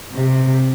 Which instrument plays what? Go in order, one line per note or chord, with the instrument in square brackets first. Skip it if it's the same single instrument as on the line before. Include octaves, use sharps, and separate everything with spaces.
[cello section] C3